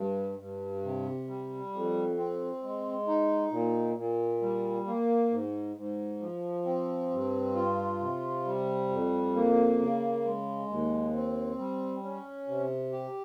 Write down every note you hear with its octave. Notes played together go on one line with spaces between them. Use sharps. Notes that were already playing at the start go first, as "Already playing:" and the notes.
Already playing: G2
G2
C3
G3
F2
C4
G#3
D#4
A#2
A#2
G3
A#3
G#2
G#2
F3
C4
G2
F4
C3
G3
F2
A#3
C#3
G#3
D#2
C4
G3
C#4
C3
G4